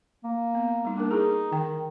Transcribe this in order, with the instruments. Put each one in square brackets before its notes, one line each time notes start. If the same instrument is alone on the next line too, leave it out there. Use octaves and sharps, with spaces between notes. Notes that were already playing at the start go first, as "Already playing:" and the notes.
[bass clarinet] A#3
[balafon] B3
G3 D#4
[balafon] A#3 A#4 [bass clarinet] D4
[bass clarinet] D#4 [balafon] E4 G#4
[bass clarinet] D#3 [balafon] G5